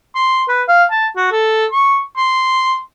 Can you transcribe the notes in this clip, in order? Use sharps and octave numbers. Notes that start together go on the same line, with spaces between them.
C6
B4
F5
A5
F#4
A4
C#6
C6